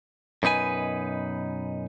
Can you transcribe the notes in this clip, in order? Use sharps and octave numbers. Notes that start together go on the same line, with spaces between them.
F#2 B2 D#4 B4 G#5